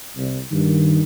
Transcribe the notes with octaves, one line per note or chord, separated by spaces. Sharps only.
C2
G2 D#3